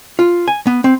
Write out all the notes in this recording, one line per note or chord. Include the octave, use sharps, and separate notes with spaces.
F4
G#5
B3
C4